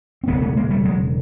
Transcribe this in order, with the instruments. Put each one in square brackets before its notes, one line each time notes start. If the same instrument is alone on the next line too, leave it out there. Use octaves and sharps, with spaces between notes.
[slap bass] C4
E1 D2 C#3 A3 B3
A3 B3
G#3 A#3
G3 A3
F#3 G#3